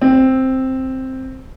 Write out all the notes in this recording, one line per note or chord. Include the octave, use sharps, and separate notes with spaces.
C4